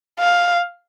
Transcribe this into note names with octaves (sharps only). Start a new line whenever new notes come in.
F5